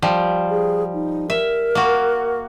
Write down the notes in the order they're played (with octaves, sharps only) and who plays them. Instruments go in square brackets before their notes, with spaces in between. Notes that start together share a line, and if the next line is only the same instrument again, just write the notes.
[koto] F3 G3
[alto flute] G#4
D#4
[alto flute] A#4 [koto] E5
[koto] A#3 F#4